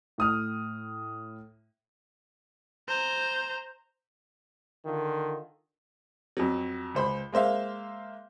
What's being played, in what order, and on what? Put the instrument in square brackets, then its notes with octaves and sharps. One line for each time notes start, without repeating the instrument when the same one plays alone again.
[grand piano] A2 D#6 F6
[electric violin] C5 A#5
[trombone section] D3 D#3 F4
[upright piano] F2 F#3
C#2 C5 B5
G#3 A#3 C5 E5 F5